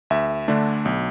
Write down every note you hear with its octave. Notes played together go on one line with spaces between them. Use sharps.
D2 E5
D3 A3 D4
B1